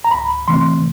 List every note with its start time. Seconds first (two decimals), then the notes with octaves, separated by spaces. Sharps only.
0.04 A#5
0.11 C#2 B5
0.48 C3 E3 A3 C4 C6